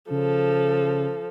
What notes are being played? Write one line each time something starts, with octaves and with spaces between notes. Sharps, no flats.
C#3 F3 A4